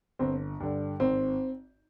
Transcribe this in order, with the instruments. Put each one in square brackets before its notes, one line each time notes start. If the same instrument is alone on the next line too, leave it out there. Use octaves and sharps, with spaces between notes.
[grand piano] G1 [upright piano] C4
[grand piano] G2 D3
[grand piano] G#1 [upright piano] C4